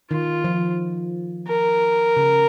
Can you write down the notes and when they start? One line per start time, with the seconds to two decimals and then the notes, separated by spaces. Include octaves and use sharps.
0.11 D#3 F4
0.44 F3
1.48 A#4
2.17 C#3